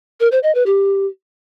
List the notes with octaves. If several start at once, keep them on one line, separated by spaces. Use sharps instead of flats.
A#4
C5
D#5
B4
G4